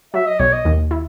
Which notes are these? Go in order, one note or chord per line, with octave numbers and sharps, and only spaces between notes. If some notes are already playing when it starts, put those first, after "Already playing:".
F#3 E5
D#5
B1 C#5
D#5
D#2
E4